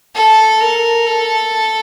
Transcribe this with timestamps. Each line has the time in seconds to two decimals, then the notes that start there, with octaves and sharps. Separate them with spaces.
0.15 A4
0.60 A#4
1.06 A4